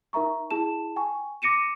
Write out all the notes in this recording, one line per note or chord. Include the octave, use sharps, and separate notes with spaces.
D#4 A#4 E5 A#5 C#6
E4 G#4 A5 E7
G5 G#5 C#6
D6 A#6 C#7 D#7 E7